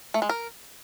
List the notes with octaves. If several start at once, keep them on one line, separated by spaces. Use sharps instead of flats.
A3
G#3
A#4